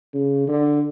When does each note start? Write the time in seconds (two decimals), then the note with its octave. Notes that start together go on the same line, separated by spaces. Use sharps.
0.14 C#3
0.48 D3